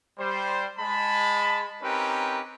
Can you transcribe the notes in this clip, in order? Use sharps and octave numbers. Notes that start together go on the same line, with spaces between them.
G3 C5
G#3 A5 B5
C4 C#4 D#4 G4 A#4 B4